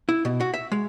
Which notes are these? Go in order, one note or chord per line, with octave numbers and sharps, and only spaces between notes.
E4
B2
F#4
E5
G#3